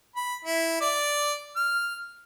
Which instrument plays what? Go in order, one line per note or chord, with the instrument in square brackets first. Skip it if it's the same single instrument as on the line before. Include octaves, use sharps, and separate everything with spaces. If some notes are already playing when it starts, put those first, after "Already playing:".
[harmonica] B5
E4
D5
F6